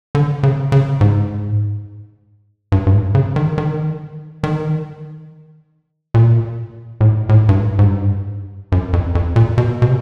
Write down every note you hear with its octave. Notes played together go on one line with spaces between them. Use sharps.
D3
C#3
C#3
G#2
G2
G2
G#2
C#3
D#3
D#3
D#3
A#2
A2
A2
G2
G#2
G#2
G2
F#2
F2
F2
A#2
B2
B2
C3